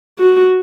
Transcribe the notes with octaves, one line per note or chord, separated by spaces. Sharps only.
F#4